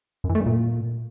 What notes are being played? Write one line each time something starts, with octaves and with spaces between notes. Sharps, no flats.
F#2
E3
A3
G2
A#2